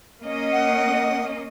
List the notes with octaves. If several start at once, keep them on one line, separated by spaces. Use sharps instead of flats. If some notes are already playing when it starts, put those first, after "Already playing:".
A#3 C#4 D#5
F#5